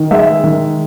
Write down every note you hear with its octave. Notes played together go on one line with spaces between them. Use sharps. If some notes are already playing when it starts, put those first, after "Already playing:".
Already playing: D#3
G#3 E5
D#3